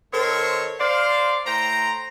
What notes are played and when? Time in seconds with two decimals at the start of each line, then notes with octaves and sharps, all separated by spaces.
0.13 D#3 C4 A4 A#4 C5 C#5
0.80 C5 D5 F5
1.46 A2 C5 G5 A#5